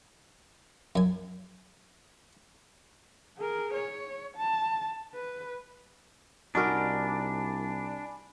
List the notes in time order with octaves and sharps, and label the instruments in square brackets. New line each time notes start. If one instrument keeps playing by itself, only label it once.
[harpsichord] F#2 G#5
[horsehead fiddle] G#4 A#4
C#5
A5
B4
[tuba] C2 [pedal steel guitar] D4 [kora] D#4 F#4 A#4 [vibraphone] G#5 B5 D6